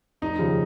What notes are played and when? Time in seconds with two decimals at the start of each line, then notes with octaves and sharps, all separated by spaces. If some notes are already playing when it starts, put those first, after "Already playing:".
0.22 F1 D#4
0.39 D#2 C#3 F3